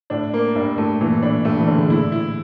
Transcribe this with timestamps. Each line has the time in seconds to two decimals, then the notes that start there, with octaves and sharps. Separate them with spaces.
0.10 A2 D4
0.34 A#3
0.55 G2 D4
0.78 A2 A3
1.01 A#2 E3
1.22 A2 D4
1.45 G2 A3
1.60 E3
1.67 D3 D4
1.75 C#3
1.82 A#2
1.90 A2 E4
2.12 E4